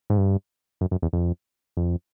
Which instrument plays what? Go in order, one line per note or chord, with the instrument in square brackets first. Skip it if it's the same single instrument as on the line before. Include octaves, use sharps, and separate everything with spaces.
[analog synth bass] G#2
G2
F#2
F#2
E2
F2
F2